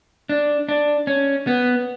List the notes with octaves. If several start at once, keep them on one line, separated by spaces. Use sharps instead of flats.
D4
D4
C#4
B3